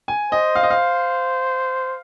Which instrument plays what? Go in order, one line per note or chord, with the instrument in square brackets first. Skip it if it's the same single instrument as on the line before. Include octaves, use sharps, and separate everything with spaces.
[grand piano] G#5
[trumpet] C5 [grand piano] D#5
[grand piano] F5
D#5
F5